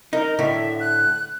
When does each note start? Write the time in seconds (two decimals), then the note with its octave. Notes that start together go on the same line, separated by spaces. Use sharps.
0.13 D#4 A#4
0.39 A2 D3 E5
0.80 F#6